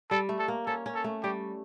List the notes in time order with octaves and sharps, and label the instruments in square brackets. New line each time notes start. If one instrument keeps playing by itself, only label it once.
[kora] G3 [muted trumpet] A4
[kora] A3
[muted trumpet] A4
[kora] A#3
[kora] C#4 [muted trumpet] A4
[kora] C#4
[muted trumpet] A4
[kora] A3
[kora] G3 [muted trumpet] G4